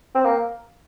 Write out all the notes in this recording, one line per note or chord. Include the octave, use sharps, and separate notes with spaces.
C4
A#3